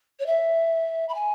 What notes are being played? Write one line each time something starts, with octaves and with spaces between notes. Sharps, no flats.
C#5
E5
B5
G#5